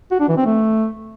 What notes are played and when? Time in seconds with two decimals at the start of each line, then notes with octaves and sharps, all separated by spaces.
0.11 F#4
0.20 D4
0.28 E3
0.37 C4
0.46 A3